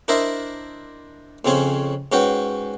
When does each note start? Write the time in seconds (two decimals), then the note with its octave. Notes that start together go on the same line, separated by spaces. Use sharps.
0.08 D4 E4 A#4 C5 D#5 E5
1.45 F2 C#3 C4 C#4 G#5
2.12 G#2 C#4 F#4 B4 G5